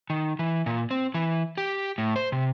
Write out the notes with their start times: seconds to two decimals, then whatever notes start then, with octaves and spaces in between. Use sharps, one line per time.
0.10 D#3
0.39 E3
0.66 A#2
0.91 C4
1.14 E3
1.58 G4
1.98 A2
2.16 C5
2.32 C3